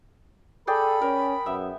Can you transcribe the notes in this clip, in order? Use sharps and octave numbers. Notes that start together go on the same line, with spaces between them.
G#4 A4 D5 G5 B5
C#4 A#4
F#2 B3 E5